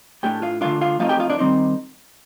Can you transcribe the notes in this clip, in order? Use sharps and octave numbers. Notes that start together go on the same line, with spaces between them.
A2 A3 D4 G4 G5
F4 F5
D3 A3 D4 F4 F5
F4 F5
F3 A3 C4 D#4 F4 F5
G4 G5
F4 F5
D4 D5
D#3 G3 C4 D#4